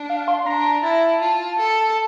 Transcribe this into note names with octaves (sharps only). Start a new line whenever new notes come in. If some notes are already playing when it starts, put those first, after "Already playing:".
Already playing: D4
F5
C6
D4 A#5
A#5
E4 A5
F4
A4